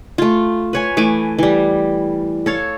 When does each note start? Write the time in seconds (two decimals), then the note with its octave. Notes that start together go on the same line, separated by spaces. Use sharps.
0.18 A3 F4
0.73 B4 C#5 G#5
0.97 E3 A3 G#5 D6
1.39 E3 G3
2.46 A4 C#5 F5